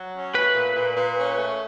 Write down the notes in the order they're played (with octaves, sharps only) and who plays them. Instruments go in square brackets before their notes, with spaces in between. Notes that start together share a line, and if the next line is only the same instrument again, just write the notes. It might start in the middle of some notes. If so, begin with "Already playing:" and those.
Already playing: [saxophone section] F#3
C#4
[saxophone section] A3 [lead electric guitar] B4
[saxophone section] A#2
A#2
A#2
C#4
A3